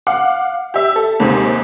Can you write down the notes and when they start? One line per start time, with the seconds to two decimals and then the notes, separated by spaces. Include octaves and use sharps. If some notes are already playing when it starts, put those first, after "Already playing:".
0.07 F5 F#5 D6
0.74 G4 E5
0.96 A4
1.20 D#2 G#2 C3